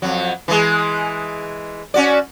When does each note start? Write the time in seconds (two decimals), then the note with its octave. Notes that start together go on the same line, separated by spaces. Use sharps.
0.02 F2 F#3
0.48 E3 G#3
1.94 C#4 F#4 D5